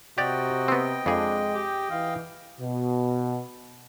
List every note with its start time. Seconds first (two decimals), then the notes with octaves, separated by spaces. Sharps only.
0.18 C3 F#4 G4 D5 D#5 G5
0.68 B3 C4
1.06 F2 G#3 D4 G#4
1.54 G4
1.91 E3 F5
2.60 B2